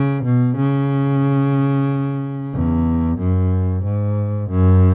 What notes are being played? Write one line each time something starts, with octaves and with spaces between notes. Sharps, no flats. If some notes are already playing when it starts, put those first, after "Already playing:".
Already playing: C#3
B2
C#3
E2
F#2
G#2
F#2